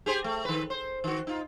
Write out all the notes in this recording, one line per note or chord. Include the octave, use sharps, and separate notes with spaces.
G4 G#4 C5
A3
D#3 B4
C5
D#3 F#4
D#4 F4